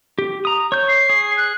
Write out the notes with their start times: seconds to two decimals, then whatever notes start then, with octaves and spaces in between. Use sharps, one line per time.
0.19 G4
0.45 A#5 D#6
0.72 C#5 G6
0.89 C7
1.10 G#4
1.37 F#6